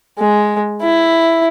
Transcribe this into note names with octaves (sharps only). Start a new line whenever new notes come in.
G#3
E4